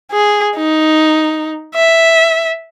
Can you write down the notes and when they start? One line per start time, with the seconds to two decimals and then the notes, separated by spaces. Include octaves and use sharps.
0.11 G#4
0.56 D#4
1.75 E5